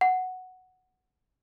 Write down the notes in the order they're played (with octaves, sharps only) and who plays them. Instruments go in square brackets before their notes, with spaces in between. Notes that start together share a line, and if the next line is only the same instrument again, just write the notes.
[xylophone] F#5